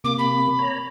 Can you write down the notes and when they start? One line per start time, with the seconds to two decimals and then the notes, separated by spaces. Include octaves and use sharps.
0.04 C3 A#3 D6
0.18 B5
0.59 C#5 A#5